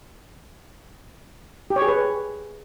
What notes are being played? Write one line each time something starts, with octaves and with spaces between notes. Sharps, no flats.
G4
C#5
G#4
B4